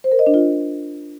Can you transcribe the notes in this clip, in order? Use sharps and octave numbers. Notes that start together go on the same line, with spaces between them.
C5
A#4
D#5
D4
F4